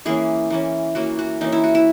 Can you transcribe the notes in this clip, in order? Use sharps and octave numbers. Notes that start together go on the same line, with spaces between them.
E3 A#3 C#4 G#4
E3 A#3 C#4
E3 A#3 C#4 F#4
F#4
E3 A#3 C#4 D#4
E4
F#4
E4